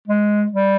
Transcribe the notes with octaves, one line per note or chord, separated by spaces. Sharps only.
G#3
G3